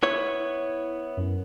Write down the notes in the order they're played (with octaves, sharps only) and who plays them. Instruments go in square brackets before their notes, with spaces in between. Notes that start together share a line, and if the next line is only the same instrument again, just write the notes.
[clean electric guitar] B3 E4 C#5
[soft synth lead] F#2